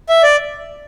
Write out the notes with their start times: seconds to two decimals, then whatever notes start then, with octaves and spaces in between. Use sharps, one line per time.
0.09 E5
0.23 D5